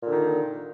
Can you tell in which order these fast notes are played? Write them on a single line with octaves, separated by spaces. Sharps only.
A#2 D3 D#3